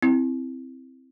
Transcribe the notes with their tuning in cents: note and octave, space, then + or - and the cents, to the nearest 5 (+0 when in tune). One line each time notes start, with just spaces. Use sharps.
C4 +0 E4 +0